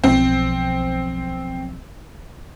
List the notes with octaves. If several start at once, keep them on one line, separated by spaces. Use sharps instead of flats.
B1 F3 C4